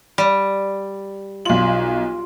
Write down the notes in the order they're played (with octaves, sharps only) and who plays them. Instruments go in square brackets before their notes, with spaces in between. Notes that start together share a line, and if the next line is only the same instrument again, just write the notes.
[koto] G3
[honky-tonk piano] B1 F#7 [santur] F4 D5